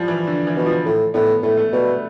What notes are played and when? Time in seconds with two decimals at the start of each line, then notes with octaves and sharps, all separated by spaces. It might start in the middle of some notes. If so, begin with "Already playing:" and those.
Already playing: F3 G3
0.08 E3
0.27 D3
0.47 E3
0.56 B2
0.66 F3
0.86 A2
1.14 A2 B3
1.43 A2 A3
1.57 A3
1.73 B2 G3
1.87 A3